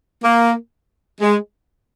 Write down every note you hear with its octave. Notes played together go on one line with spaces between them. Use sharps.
A#3
G#3